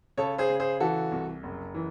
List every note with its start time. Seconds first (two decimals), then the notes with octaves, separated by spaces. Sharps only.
0.18 C#3 A4 C#5
0.38 G#4 C5
0.50 C#3
0.60 G#4 C5
0.80 E3 F#4 A4
1.12 C2
1.43 F#1
1.74 E3